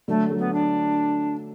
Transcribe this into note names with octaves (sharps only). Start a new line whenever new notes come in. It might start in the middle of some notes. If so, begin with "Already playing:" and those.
D3 F#3 A3
F#3 A3
B3
D4